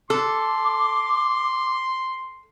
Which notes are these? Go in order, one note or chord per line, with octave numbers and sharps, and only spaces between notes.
A4 C6 D6